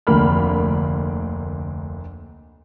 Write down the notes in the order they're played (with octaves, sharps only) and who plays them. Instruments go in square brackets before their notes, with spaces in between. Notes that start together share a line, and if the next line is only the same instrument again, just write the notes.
[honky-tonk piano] F1 D2 A#3 B5 F6